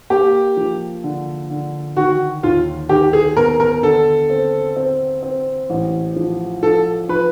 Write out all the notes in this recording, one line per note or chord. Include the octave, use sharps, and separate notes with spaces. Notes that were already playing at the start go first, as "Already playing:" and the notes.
A#3 G4
F3
D3
D3
D#3 F#4
D#2 F4
D#3 G4
G#4
B3 A#4
A#4
D3 A4
C4
C4
C4
A1
F3
F3 A4
F3 B4